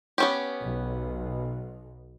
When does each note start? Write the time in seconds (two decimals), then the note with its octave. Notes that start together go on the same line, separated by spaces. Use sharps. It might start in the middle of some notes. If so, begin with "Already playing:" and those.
0.18 B3 C#4 G4
0.61 B1 B2